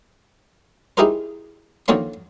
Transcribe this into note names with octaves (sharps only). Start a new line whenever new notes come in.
D#4 E4 G4 G#4 A#4 C5
D3 D#3 F3 A#3 C#5 C6